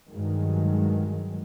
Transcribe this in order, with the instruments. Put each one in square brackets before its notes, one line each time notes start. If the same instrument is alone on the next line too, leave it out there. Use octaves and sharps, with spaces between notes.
[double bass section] G2 D#3 F#3 G#3